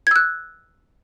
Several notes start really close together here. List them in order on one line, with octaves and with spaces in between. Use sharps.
G#6 E6 F#6